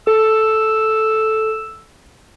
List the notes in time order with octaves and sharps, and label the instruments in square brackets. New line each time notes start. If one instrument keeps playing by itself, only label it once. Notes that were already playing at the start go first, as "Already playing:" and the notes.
[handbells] A4 [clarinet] E6